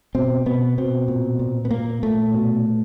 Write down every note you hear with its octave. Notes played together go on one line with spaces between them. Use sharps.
B2 C4
B2 B3
B2 C4
A#2
A#2
B3
A#2 A#3
A#2 A3
B2